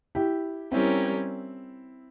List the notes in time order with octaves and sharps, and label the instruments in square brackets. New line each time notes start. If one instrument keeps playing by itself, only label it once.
[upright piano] E4 G4
[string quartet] G3 C#4 G4 A#4 [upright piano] C4 E4